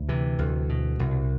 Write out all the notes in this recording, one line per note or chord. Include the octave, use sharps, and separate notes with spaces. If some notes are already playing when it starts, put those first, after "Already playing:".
Already playing: D2
C3 E3
D2
B2
C2